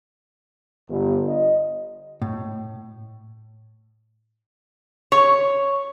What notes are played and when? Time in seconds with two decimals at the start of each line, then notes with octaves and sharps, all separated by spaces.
0.89 G1
1.27 D#5
2.22 A2
5.12 C#5